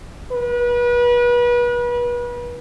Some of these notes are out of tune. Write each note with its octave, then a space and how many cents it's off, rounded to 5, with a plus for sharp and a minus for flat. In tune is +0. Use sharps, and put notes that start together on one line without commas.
B4 -35